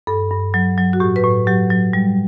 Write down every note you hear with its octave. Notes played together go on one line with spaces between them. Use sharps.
G2 A4
G2
F#3
F#3
F#4
A2 G4
B4
A2
F#3 G4
F#3
G3